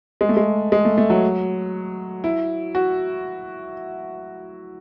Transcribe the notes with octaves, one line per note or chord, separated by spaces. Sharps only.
G#3
A3
G#3
G#3
A3
A3
F#3
E4
F#4